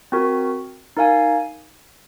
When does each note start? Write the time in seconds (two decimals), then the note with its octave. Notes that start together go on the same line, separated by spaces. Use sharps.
0.12 C4 F#4 A#4
0.97 D#4 A#4 F5 G#5